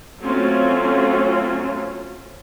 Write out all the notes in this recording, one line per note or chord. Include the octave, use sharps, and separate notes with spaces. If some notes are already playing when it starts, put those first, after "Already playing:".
F#3 A3 C4 C#4 F4